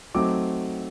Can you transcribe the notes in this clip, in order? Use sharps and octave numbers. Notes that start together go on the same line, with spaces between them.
F#3 A3 C4 D#4 D6